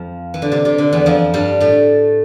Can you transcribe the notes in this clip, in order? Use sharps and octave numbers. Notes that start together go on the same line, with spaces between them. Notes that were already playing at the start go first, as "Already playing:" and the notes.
Already playing: F2 F3
E3
D3
C3
C3
D3
E2 E3
F2 F3
G2 G3
A2 A3